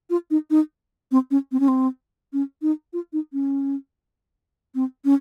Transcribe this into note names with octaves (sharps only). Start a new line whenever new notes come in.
F4
D#4
D#4
C4
C#4
C4
C#4
C4
C#4
D#4
F4
D#4
C#4
C4
C#4